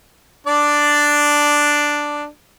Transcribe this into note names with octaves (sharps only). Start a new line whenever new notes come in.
D4 D5